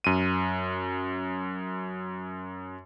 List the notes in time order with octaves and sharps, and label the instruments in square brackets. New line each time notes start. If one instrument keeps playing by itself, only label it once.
[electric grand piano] F#2 D#7